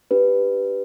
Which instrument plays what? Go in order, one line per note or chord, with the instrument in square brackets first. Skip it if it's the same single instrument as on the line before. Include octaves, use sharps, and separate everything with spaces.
[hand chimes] D4 G4 B4